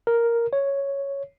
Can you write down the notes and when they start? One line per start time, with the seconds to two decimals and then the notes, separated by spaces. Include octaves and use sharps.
0.07 A#4
0.53 C#5